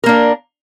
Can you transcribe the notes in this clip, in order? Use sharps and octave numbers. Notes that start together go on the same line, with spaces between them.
A#3 D4 A#4